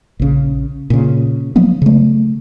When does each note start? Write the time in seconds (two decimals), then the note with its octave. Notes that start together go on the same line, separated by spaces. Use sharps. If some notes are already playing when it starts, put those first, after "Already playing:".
0.20 A#1 C#3
0.90 A#2 C#3
1.56 F3 F#3 A#3 B3
1.82 C#3 A3